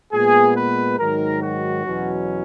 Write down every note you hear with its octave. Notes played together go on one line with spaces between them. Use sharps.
A#2 G#3 B3 G#4
B4
G#2 D#3 F#3 A#4
F#4
E2 B2 F#3 C#4